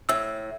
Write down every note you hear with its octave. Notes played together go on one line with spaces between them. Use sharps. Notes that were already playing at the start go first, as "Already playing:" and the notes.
A2 E6